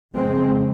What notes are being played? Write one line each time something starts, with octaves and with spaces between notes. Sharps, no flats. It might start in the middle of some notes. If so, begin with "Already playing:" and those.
F2 C#3 G#3 C4